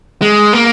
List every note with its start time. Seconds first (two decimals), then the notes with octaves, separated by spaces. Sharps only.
0.22 G#3
0.53 A#3